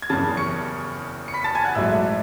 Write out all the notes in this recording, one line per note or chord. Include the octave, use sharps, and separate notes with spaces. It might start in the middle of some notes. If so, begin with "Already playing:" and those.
G#6
F#1 E2 C#3 A5 A6
C#6 C#7
C#7
B5 B6
A5 A6
G#5 G#6
F#5 F#6
A1 G#2 F#3 A3 E5 E6